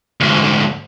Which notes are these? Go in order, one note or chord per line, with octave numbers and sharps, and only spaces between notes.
D2 G#2